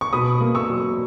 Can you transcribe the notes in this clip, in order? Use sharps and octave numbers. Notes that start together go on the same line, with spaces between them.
C#6
B2 B5 D#6
A#3
C#6 E6
F#3